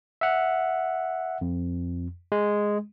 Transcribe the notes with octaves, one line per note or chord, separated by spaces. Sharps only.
E5 F#5
F2
G#3